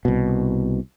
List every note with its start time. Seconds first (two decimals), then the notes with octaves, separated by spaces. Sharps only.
0.05 C2 B2